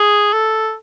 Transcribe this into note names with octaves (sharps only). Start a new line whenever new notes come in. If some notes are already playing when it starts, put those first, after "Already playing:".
Already playing: G#4
A4